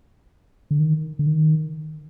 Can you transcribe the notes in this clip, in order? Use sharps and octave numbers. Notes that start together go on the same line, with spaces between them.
D3
D#3
D3
D#3